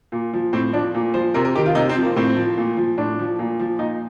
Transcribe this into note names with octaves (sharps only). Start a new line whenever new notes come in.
A#2
F3
A2 C4
F3 D4
A#2
F3 C5
C3 A#4
A#4
D#3 G4
F4
C3 D#4
C4
F3
A#3
A2 C4
F3
A#2
F3
A2 D4
F3
A#2
F3
A#2 D#4